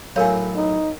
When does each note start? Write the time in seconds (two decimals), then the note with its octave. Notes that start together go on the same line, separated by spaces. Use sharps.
0.16 B1 A2 A#4 C#5 F5 G#5
0.56 D#4